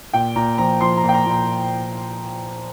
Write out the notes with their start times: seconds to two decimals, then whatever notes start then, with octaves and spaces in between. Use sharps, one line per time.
0.13 A#2 G5
0.36 A#2 A#5
0.58 F3 A#5
0.80 F3 C6
0.97 A#5
1.03 A#2
1.09 G5
1.14 A#5
1.26 A#2
1.31 A#5